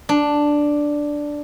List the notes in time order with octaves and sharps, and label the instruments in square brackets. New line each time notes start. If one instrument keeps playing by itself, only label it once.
[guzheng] D4